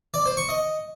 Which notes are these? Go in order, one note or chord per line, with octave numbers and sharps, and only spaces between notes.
D5
C5
C#6
D#5